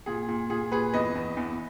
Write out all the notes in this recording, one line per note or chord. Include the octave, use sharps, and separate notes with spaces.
A#2 G#4
A#2
A#2 G#4
A#2 G#4 B4
E2 B4 D#5
E2
E2